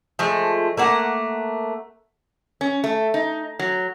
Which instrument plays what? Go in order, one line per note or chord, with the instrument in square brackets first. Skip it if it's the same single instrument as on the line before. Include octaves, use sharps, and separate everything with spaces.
[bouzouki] F3 G#3 A3
A3 A#3 F#5
[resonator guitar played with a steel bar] C#4
A3
D#4
F#3